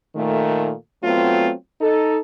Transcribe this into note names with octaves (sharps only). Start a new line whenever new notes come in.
A#2 D#3 A3
F#3 A3 B3 C4 F4
D#4 A4